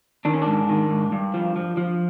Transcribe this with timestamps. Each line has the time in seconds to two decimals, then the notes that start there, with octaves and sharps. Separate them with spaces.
0.25 D#3 D4
0.34 C#4
0.42 G#2 D4
0.69 D#3
0.91 G#2
1.12 G2
1.34 F3
1.56 F3
1.77 F3